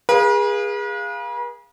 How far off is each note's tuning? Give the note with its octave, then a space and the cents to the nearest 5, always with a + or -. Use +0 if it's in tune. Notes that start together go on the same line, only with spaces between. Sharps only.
G#4 -20 B4 -45 F5 +0